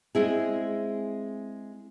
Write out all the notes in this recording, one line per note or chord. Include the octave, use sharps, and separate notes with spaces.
G#3 C4 E4 G#4